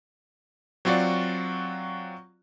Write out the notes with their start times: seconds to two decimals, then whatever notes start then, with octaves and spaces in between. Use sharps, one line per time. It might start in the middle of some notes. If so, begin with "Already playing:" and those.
0.85 F#3 C4 F4 F#4 D5